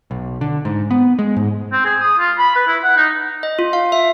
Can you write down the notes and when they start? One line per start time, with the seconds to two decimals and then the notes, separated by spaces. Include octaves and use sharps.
0.11 B1
0.41 D3
0.65 G#2
0.91 B3
1.19 G#3
1.36 G#2
1.72 C4
1.85 G#4
2.01 D#6
2.19 F4
2.38 B5
2.56 B4
2.67 E4
2.84 F#5
2.97 D#4
3.43 D#5
3.59 F4
3.73 F5
3.92 E5